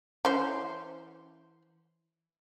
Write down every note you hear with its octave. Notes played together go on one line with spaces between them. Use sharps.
E3 C#4 C5